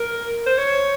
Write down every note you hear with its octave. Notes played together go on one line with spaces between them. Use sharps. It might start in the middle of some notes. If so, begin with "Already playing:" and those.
Already playing: A#4
C5
C#5